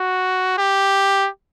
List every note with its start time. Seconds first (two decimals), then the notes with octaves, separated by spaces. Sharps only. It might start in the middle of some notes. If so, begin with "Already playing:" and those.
Already playing: F#4
0.58 G4